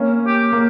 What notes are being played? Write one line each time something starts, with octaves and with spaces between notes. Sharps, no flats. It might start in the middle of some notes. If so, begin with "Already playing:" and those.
Already playing: A#3 C#4
G4
A#3